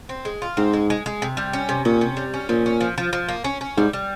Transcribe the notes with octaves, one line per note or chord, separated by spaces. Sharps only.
C4
G#3
F4
G#2 C4
G#3
G#3
G#3
C3
G3
C#4
C3
A#2 C#4
C3
G3
C#4
A#2 F3
C#4
F3
F3
F3
A#3
C#4
C#4
G#2 G3
G3